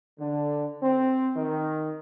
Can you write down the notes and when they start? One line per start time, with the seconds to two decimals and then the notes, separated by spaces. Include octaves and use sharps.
0.19 D3
0.82 C4
1.36 D#3